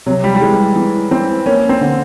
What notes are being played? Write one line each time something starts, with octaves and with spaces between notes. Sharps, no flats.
C3 F#3
G3
G3
E3 G#3
E3
E3 C4
A#3 C#4
C4
D3